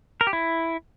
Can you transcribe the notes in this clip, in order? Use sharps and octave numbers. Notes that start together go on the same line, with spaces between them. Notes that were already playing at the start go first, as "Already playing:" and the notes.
A#4
G4
E4